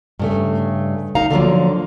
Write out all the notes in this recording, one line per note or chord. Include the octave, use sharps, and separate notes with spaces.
G2 C#3 A3
D2 D#4 F5 A#5
D3 F3 F#3 A#3